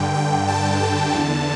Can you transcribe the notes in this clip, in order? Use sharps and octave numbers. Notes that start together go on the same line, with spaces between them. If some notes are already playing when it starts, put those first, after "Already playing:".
Already playing: G2 D3 G5
G5
A5
A5
E2 D3